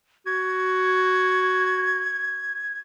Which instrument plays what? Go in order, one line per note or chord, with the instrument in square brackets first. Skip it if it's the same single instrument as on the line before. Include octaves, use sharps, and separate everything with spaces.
[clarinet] F#4 [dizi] G#6